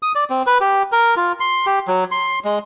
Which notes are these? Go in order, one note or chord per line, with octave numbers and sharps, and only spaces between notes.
D#6
D5
C4
B4
G4
A#4
F4
C6
G4
F#3
C6
G#3